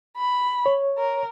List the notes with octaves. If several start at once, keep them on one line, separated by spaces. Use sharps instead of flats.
B5
C#5
A#4